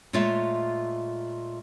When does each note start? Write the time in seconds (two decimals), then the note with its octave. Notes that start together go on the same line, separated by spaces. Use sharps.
0.13 A#2 G#3 A3 F4 C#5 E5